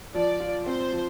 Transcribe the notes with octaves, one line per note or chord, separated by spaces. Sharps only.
F3 D5
F4
C4 C5
F3